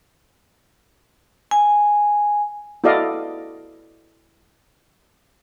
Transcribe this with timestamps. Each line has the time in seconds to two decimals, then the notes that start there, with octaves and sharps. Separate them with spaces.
1.51 G#5
2.84 E4 F#4 A4 D5 D#5 F5